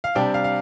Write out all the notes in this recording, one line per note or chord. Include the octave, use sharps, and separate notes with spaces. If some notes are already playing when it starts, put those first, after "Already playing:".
F5
C3 G3 D4 G5
F5
F5